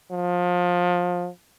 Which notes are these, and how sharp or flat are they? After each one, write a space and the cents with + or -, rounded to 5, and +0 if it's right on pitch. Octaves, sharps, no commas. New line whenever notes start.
F3 +25